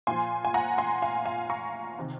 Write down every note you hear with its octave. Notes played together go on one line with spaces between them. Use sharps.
A#2 F3 G#5 C6
G#5
F#5 A#5
G#5 C6
F5 G#5
F5 G#5
A#5 C#6
C3 D#3